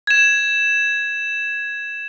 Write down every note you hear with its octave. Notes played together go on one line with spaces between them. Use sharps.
G#6 E7